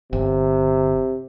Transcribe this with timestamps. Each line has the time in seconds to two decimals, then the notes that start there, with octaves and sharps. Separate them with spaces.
0.13 G1 C3